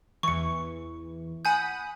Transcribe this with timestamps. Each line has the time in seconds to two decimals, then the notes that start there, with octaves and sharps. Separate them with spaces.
0.23 E2 E3 C#6 C#7
1.45 F#5 G#5 B5 D#6 G6